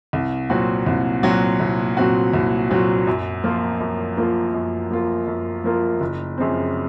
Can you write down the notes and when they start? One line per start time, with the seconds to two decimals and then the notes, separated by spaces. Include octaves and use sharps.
0.13 C2
0.50 A#2 F#3 C4 F#4
0.86 C2
1.23 A#2 F#3 C4 F#4
1.60 C2
1.97 A#2 F#3 C4 F#4
2.34 C2
2.70 A#2 F#3 C4 F#4
3.07 F#2
3.44 F3 A#3 F4 A#4
3.80 F#2
4.17 F3 A#3 F4 A#4
4.54 F#2
4.90 F3 A#3 F4 A#4
5.27 F#2
5.64 F3 A#3 F4 A#4
6.00 F#1
6.38 F#2 C#3 F3 C4